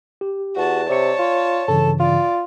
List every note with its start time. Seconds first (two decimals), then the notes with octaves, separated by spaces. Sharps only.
0.21 G4
0.56 E2 F#4 A5
0.89 C3 C#5 D5 A5 C#7
1.19 F4
1.68 G2 C#3 E3 A4
2.00 F4 D5